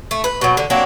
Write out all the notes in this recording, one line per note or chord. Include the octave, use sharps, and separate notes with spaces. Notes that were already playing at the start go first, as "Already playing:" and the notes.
A3
B4
B2 F#3
D3
F#3 A#3 C4 D4